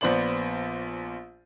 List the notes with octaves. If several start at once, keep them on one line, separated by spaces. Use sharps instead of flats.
A#1 B3 C5 D5 F#7